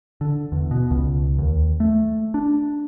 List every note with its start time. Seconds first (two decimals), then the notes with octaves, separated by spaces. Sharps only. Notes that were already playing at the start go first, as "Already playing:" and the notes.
0.21 D3
0.52 E2
0.71 B2
0.91 C#2
1.38 D#2
1.80 A3
2.34 D4